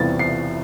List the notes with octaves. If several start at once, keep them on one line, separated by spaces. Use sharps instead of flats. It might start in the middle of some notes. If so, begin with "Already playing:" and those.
Already playing: E2 C3 G3 B3 A6
C7